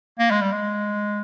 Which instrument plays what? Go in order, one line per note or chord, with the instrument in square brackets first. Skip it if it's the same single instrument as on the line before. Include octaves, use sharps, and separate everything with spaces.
[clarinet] A#3
G#3
G3
G#3